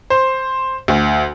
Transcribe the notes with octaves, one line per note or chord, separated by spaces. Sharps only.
C5
D2